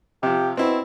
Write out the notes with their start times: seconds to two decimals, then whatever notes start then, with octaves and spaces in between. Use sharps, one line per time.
0.23 C3 F3 G4
0.57 B2 C4 E4